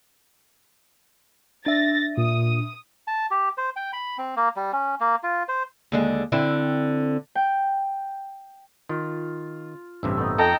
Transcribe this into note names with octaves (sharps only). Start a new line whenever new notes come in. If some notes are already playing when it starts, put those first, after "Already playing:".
D4 E5 A6 A#6
A#2 D#6
A5
G4
C5
G5
B5
C4
A#3
G3
C#4
A#3
F4
C5
D#2 D3 G#3
D3 C4 E4
G5
D#3 F4
A1 G2 C3 E5
A3 B3 D#4
F2 A4 D#5 G5 A5 A#5